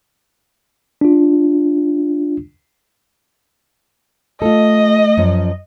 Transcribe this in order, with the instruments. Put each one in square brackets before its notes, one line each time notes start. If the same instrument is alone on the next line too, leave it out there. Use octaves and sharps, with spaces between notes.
[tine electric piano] D4 F4
[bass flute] A3 [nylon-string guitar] F4 A4 [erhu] D#5
[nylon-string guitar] F#2 F3